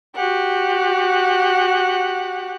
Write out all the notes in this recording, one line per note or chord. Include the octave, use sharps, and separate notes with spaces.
F#4 G4 F#5